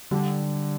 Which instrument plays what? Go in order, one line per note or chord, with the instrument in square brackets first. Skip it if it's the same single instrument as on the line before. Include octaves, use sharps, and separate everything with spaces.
[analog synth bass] D3 [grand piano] G3